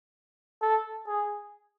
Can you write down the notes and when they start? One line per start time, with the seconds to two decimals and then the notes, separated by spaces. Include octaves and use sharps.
0.62 A4
1.07 G#4